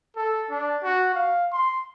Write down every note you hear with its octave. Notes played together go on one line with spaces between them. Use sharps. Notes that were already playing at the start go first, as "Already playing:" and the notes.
A4
D4
F#4
F5
C6